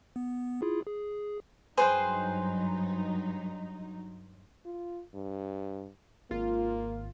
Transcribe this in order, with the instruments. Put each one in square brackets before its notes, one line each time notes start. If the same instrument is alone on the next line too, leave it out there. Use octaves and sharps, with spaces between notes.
[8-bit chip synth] B3
E4 F4 G#4
G#4
[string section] G2 F#3 D#4 [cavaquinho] G#4 B4 G5 [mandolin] C5
[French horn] F4
G2
[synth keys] G#1 F4 [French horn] A#3